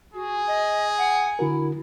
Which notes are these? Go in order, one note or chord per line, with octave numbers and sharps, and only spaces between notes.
F#4 G#4
D#5
F#5
D3 E4 F#4 A#4